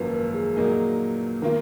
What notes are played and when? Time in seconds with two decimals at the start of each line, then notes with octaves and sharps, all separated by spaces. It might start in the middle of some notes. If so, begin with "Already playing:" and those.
Already playing: G#1 F#2 F3 A#3 A#4 B4
0.13 A#4
0.34 G#4
0.55 A#2 F#3 A#3 D#4 G#4 A#4
1.42 D#3 A#3 F4 A#4